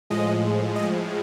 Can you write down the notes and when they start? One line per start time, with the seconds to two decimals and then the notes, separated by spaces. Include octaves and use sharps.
0.10 A2 F3 G#3 D#5
0.76 D#5